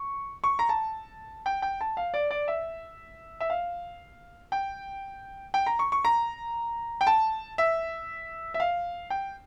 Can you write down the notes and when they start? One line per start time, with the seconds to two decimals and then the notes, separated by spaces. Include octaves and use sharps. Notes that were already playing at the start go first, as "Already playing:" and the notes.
Already playing: C#6
0.44 C#6
0.59 A#5
0.69 A5
1.46 G5
1.62 G5
1.81 A5
1.97 F5
2.14 D5
2.31 D5
2.48 E5
3.40 E5
3.50 F5
4.52 G5
5.54 G5
5.67 A#5
5.79 C#6
5.92 C#6
6.05 A#5
7.01 G5
7.07 A5
7.58 E5
8.54 E5
8.60 F5
9.10 G5